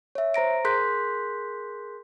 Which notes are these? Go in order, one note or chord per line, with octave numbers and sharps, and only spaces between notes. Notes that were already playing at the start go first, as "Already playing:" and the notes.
C#5 E5
C5 A#5 A#6 D7
G#4 A#4 C6 F#6 G6 B6